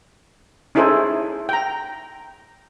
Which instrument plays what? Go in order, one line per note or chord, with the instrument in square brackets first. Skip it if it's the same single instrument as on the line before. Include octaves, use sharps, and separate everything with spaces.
[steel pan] C#4 D#4 E4 G#4 A4 C5
G5 A#5